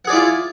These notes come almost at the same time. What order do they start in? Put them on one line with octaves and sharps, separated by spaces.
F#5 G#4 D5 E4 F4